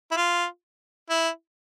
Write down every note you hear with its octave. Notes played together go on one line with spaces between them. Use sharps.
E4
F4
E4